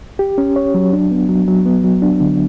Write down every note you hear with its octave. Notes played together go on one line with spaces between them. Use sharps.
G4
C#4
C#5
F#3
D4
B3
F#3
F#3
B3
F#3
D4
D3